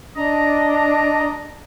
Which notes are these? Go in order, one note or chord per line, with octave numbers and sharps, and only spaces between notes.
D4 D#5 A#5